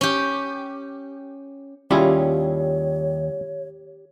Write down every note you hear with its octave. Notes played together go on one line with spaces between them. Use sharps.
C#4 G4
D#2 G3 C#4 E4 F4 G4 G#4 C#5